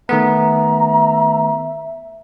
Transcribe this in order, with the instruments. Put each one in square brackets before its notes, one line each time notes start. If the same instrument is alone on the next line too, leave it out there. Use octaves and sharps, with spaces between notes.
[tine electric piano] D#3 A3 B3 [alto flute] E5 [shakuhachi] A#5